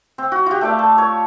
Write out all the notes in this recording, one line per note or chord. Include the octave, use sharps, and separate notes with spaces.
C4
F#4
F4 G4
A3 D5 F5
A5
C#5